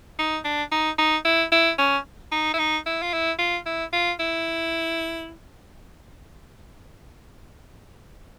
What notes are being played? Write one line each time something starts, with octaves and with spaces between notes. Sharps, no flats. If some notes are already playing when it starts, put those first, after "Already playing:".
D#4
D4
D#4
D#4
E4
E4
C#4
D#4
E4
D#4
E4
F4
E4
F4
E4
F4
E4